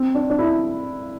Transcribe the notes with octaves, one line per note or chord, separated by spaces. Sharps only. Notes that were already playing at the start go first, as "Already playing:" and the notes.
Already playing: C4
D4
D4
E4